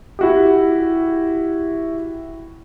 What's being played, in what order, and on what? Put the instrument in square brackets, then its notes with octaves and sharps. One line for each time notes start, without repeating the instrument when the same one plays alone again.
[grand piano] E4 F#4 G4